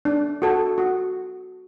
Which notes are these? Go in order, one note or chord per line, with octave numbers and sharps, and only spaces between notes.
D4
F#4 A4
F#4